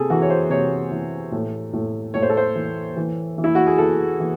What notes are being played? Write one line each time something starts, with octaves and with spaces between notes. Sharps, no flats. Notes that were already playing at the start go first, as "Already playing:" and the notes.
Already playing: C3 G#4 A4
E3 F#4
C#5
C5
C3 C#5
E3
A2
A2
A2 C#5
C5
A4
C5
E3
E3
E3
E4
F#4
G#4
E3 A4
E3